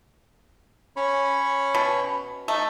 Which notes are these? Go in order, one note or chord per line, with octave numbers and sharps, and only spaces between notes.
C#4 C#5 B5
B2
A3 D#4